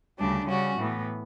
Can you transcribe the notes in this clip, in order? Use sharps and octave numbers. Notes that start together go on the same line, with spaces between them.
D2 C#3 G3 D4
C#3 G3 C#4 F#4
A2 E3 B3